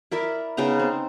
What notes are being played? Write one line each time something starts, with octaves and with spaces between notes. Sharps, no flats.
E4 A#4 D5 E5
C#3 B3 D#4 A#5
C4